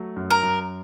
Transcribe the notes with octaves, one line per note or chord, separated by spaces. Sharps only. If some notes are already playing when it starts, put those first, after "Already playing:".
Already playing: F#3 A3
F#2
A#4
F#2